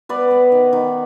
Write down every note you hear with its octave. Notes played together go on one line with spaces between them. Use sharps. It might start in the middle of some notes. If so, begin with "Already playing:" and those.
B3 B4 D5
B3
D#3
D#3